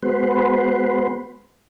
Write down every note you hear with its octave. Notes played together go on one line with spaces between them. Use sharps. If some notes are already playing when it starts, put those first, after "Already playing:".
G#3 B3 F#4 B4 C5